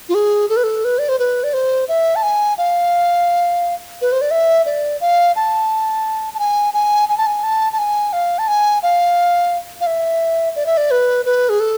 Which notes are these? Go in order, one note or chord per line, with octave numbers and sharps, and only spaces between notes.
F4
G#4
A4
B4
A4
B4
D5
C5
B4
D5
C5
E5
A5
G#5
F5
B4
C5
D5
E5
D5
F5
A5
A5
G#5
G#5
G#5
A5
G#5
A5
A5
G#5
F5
A5
G#5
F5
F5
E5
D5
E5
D5
B4
B4
G#4
A4